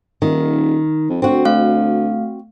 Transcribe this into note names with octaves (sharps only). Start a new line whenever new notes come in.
D#1 D#3
F2
D2 C4 F#4
A3 F5